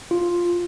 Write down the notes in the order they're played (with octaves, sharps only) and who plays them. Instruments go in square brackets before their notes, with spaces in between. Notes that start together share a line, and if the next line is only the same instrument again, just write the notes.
[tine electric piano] F4